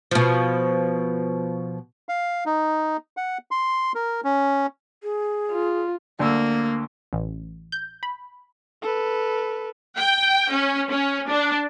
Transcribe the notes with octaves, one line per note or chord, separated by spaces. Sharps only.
B2 F3
F5
D#4
F#5
C6
A#4
C#4
G#4
F4
D2 A#3 E6
A1
G6
B5
A4 B4
G5
C#4
C#4
D4